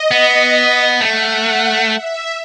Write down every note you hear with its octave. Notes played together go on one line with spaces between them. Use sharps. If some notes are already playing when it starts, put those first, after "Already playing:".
Already playing: D#5
B3
A3 F#5
E5